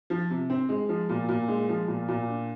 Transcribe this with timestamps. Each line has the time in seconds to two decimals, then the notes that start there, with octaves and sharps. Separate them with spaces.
0.10 F3
0.30 C3
0.50 C4
0.69 G#3
0.89 F3
1.09 A#2
1.29 A#2
1.48 G#3
1.69 F3
1.88 A#2
2.08 A#2
2.28 D4